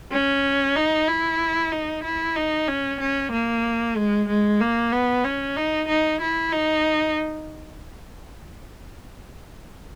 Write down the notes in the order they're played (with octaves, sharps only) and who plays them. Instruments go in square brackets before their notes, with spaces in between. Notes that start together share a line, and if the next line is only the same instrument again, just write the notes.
[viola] C#4
D#4
E4
D#4
E4
D#4
C#4
C#4
A#3
G#3
G#3
A#3
B3
C#4
D#4
D#4
E4
D#4